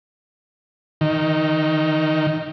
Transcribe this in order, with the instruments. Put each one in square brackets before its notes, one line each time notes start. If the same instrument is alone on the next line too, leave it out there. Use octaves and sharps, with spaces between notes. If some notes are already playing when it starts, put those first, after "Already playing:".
[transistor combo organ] D#3